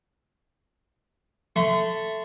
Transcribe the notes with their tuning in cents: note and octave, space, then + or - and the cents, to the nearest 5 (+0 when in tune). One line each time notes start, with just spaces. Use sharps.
A3 +0 C6 -30